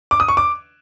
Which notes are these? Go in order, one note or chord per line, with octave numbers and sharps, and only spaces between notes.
D6
D#6
C#6
D6